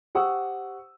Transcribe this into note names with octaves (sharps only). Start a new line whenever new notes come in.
G4 C5 F#5 C#6 D#6 E6